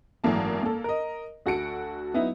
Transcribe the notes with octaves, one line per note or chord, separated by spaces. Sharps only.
G#1 F#2 E3 A3 A#3 A5
A#3 A4
A#4 D#5
D2 F#4 A4 C#7 D7
F#3 B3 D#4 E4